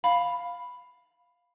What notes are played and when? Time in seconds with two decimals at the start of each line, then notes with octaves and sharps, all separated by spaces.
0.04 F5 B5